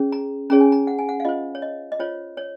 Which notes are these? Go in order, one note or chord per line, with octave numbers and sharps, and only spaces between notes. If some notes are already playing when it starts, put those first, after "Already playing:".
Already playing: C#4 G#4 C#5
A#5
C#4 G#4 C#5 A#5
G#5
A#5
F#5
G#5
F#5
F5
F4 C5 D#5
C#5
D#5
D#5
F4 C5 C#5
C#5